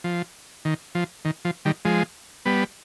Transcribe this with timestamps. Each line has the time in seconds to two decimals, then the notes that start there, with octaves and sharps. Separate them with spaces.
0.04 F3
0.65 D#3
0.95 F3
1.25 D#3
1.45 F3
1.65 D#3 G3
1.85 F3 G#3
2.45 G3 B3